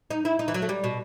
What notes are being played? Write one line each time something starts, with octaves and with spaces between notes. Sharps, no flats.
D#4
E4
D#4
E3
F#3
A3
G3
B2